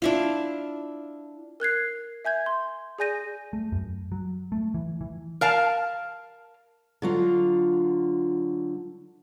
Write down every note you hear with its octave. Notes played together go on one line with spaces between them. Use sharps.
D4 E4 F4
A#4 F#6 G#6 C7
E5 G#5 G6 G#6
C6
G#4 D5 G#5 G6 A#6 D#7
A3
F#2
F#3
A3
E3
E3
A#4 F5 A5
D3 F#3 F4